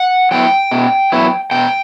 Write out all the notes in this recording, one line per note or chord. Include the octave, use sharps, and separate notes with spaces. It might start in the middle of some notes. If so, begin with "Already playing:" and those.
Already playing: F#5
F#3 B3 E4 G5
B2
F#3 B3 E4
B2 G5